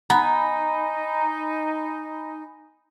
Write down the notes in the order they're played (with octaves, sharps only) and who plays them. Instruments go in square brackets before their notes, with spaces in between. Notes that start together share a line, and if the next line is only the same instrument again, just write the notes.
[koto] B3 [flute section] D#4 [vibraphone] G#5 B5 [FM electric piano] A#5